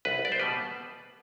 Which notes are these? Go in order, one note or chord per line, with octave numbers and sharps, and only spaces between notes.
C2 B4
D5
C5
B2 G3 B3 B4